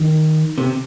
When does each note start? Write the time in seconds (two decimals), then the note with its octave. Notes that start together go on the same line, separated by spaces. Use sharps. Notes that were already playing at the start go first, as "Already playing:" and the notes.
Already playing: D#3
0.58 C3